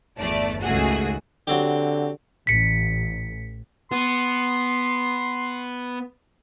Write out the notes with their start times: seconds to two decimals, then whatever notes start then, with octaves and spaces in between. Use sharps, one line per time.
0.19 G1 E2 A3 D5
0.62 C#2 D#3 A3 F#4 G#4
1.47 D3 F#3 C4 G4
2.47 A1 B6 C#7
3.92 B3 C6